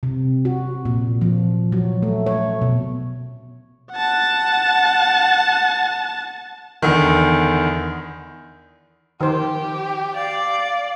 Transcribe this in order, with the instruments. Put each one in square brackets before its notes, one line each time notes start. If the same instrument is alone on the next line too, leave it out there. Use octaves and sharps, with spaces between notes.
[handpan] C3
F#4
A#2
F3
F#3
A3
C#5
B2
[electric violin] F#5 A5
[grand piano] E2 D3 D#3
[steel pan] D#3 F3 C5 [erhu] G4
[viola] D5 [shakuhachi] F5